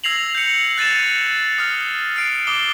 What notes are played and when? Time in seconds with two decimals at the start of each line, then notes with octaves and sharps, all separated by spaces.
0.04 E6 G#6 A#6 C7 F7 F#7
0.35 G6 C#7
0.77 F#6 A6 D#7 E7
1.58 D#6 F6
2.16 F6 C7 D7
2.47 D6 D#6 G7